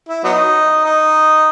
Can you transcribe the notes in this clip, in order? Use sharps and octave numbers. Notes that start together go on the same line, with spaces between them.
E4
F#3 B3 D#4
D#4